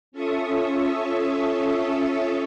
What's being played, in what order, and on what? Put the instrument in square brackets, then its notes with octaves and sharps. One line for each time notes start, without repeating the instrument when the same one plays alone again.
[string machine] C#4 F4 A4 E5 C#6 D#6